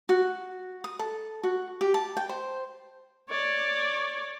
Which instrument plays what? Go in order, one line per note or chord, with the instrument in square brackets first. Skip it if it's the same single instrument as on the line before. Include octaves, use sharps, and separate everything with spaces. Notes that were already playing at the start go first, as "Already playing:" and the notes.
[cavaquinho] F#4
D#6
A4
F#4
G4
A5
G5
C5
[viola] C#5 D5